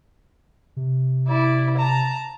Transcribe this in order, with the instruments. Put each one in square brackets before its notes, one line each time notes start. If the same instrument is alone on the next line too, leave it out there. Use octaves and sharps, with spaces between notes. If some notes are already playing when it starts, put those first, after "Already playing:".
[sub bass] C3
[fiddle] E4 D5
A5 A#5